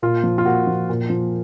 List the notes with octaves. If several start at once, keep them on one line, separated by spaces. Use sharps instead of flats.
A#2 F4
F3
F4
A#2 F#4
F3
A#2
F3